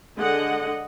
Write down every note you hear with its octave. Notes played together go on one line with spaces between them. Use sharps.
D3 G#3 D#5 F#5